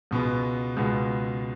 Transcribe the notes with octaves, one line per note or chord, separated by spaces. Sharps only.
C#2 B2 G#3 B3
C#2 B2 G#3 B3